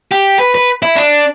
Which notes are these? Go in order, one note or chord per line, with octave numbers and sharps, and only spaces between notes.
G4
B4
B4
E4
D4